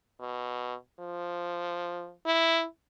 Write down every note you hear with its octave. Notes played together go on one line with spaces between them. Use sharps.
B2
F3
E4